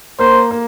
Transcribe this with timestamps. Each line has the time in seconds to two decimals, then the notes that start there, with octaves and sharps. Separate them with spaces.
0.19 A#3 C5
0.51 A#3